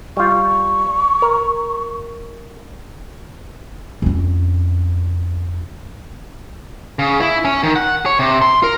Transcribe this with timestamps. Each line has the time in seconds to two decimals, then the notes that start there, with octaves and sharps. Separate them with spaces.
0.17 G3 F4 C#6
1.22 A#4
4.02 F2 C#4
6.99 C#3
7.20 E4
7.45 C#4
7.63 D#3
7.76 F#5
8.06 C#5
8.19 C3
8.42 C6
8.63 A#4